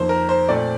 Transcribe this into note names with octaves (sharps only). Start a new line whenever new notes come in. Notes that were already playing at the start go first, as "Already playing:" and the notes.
Already playing: F2 D#3 A#3 C5
A#4
C5
A#2 A3 C4 D5